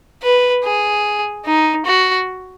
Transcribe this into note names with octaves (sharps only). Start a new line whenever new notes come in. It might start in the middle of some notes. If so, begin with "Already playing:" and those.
B4
G#4
D#4
F#4